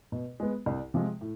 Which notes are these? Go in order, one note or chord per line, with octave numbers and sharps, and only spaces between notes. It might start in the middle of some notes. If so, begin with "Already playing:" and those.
B2
G#3 B3
C2
C3 F3 G#3
A2